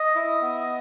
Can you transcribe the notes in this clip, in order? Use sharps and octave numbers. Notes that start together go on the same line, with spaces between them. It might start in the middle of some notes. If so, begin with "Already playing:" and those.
Already playing: D#5
E4
B3